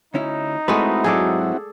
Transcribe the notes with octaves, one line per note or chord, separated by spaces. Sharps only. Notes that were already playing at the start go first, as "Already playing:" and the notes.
D2 C#4 D#4 E4
G#3 A3 C4 E4 F#4 B4
G#2 F#3 G#4 A4 D5